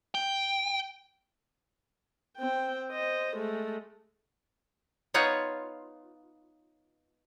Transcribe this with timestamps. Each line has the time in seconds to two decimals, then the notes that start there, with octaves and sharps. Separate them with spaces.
0.15 G5
2.37 C4 G5
2.90 C5 D#5
3.37 G#3 A3
5.14 B3 D#4 F4 C#5 F#5